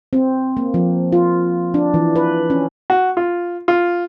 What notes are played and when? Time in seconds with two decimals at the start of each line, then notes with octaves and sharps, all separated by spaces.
0.13 C4
0.57 A#3
0.74 F3
1.12 F4
1.74 D4
1.94 E3
2.16 B4
2.50 C#4
2.90 F#4
3.17 F4
3.68 F4